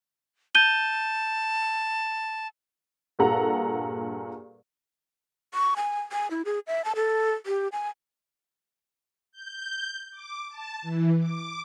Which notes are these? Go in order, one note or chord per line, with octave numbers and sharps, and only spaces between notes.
A5 G6 D#7 G7
G2 A#2 G#4 A4 F#5 A#5
C#6
G#5
G#5
E4
G#4
E5
A5
A4
G4
G#5
G6
D6
A5
E3
D6